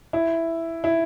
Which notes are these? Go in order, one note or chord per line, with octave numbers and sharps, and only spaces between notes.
E4
E4